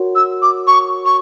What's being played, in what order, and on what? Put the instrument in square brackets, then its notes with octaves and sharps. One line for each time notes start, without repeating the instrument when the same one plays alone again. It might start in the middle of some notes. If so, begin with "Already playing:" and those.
Already playing: [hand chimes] F#4 A#4 C#5
[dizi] E6
D6
C#6
C#6